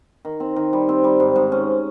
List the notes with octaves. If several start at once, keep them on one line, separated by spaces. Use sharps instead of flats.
D#3
C4
D#3
G3
C4
G3
G#2
G#2
C#4